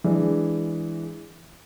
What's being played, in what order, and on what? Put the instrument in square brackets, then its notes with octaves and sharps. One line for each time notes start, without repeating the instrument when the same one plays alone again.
[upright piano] E3 G#3 D4